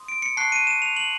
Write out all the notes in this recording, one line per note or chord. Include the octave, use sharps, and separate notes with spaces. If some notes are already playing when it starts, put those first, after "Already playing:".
Already playing: C6 D#6
D7
C#7
A5 C#6 F#6 C7
D#7
E7
F7
F#7